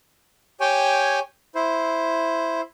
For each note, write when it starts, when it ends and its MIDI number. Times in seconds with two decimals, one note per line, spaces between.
0.60 1.19 67
0.60 1.19 73
0.60 1.19 79
0.60 1.19 80
1.55 2.61 64
1.55 2.61 72